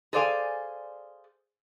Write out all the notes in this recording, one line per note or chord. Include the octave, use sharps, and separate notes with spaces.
G#4 A4 C5 D5 F5 G#5